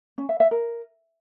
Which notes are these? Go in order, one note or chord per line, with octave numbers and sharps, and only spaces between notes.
C#4
E5
E5
A#4